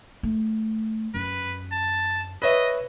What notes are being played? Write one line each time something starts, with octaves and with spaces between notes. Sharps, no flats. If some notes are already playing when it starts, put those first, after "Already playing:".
A3
F#2 B4
A5
B4 C#5 D#5 E5